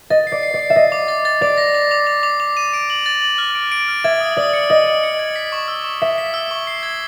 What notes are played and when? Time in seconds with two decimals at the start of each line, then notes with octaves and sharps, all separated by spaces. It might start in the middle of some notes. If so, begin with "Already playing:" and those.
0.10 D#5 A6
0.27 D5 C7
0.43 C7
0.54 D5
0.59 C7
0.70 E5
0.76 D#5 C7
0.92 D6
1.08 A6
1.25 A6
1.41 D5 D6
1.58 A#6
1.75 D6
1.91 D6
2.07 D6
2.23 D6
2.40 D6
2.57 D#7
2.73 D7
2.90 F#7
3.06 A6
3.22 F#7
3.38 F6
3.55 D7
3.72 D7
3.88 F6
4.04 E5 G#6
4.20 D#6
4.37 D5 D#6
4.53 C#7
4.70 D#5 D#6
4.86 C#7
5.03 C#7
5.19 G#6
5.36 B6
5.52 C#6
5.68 E6
5.84 C#6
6.02 E5 B6
6.18 B6
6.34 E6
6.51 C#6
6.67 C7
6.83 G#6